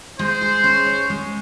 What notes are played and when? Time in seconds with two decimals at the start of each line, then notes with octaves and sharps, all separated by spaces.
0.19 G#3 C5
0.41 G#4
0.64 C#4
0.86 C#5
1.10 G#3